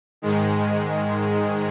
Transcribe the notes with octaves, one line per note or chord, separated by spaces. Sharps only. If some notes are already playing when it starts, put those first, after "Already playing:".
G#2 D#3 G#3